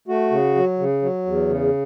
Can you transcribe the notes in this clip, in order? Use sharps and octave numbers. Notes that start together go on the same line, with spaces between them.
A3 F#4
C#3
F#3
C#3
F#3
E2
C#3